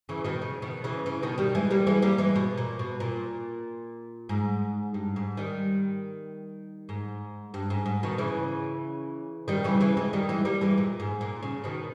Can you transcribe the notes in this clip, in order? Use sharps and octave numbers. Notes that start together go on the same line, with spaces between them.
C#3 E3
B2 D#3
C#3
B2 D#3
C#3 E3
C#3 E3
B2 D#3
D#3 G3
E3 G#3
G3 A#3
E3 G#3
G3 A#3
E3 G#3
B2
A#2
B2
A#2
G#2
G2
G#2
D#3 G3
G#2
G2
G#2
G#2
B2 D#3
C#3 E3
D#3 G3
C#3 E3
C#3 E3
E3 G#3
D#3 G3
E3 G#3
G3 A#3
E3 G#3
A#2
G#2
A#2
C#3
B2 D#3